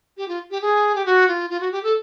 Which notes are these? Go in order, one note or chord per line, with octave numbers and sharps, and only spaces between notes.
G4
F4
G4
G#4
G4
F#4
F4
F4
F#4
G4
A4